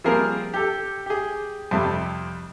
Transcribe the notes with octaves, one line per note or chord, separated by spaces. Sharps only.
F3 G3 A#3 C4 G#4 A#4
G4 A4
G4 G#4
F2 C3 G3 A3 A5